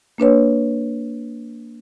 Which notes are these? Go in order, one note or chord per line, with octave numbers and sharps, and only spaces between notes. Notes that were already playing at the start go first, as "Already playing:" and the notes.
A#3 D4 B4 C#5